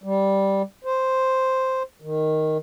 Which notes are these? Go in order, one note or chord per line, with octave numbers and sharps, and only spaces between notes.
G3
C5
D#3